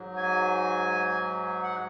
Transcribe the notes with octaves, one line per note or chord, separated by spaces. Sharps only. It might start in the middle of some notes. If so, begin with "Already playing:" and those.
Already playing: G#2 F#3
G#5
F#5